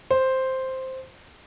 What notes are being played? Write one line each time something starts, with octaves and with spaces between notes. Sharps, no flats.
C5